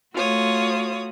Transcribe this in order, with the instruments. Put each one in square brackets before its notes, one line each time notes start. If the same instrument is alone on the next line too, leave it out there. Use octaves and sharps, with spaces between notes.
[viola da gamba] A3 F#4 [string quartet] F4 C#5 D#6